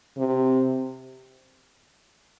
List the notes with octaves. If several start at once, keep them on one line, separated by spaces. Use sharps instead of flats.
C3